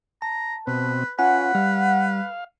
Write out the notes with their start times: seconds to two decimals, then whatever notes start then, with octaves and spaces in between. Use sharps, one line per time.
0.22 A5 A#5
0.67 B2 C4 B4
1.19 C#4 F4 B4 F#5 G#5
1.55 G3 F5